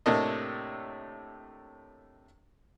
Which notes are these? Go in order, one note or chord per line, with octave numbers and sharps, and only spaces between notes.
A2 C3 A3 A#3 D4 D#5